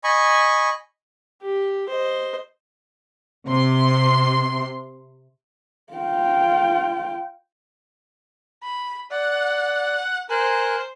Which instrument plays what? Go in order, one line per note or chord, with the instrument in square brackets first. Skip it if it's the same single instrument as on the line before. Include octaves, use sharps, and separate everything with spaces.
[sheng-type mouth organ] D#5 G#5 B5 C#6
[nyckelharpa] G4
C5 D#5
[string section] C3 C6
[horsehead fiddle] F4 G5
[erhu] B5
[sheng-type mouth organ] D5 [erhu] F#5
[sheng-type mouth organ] A#4 G#5 F#6 [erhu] C5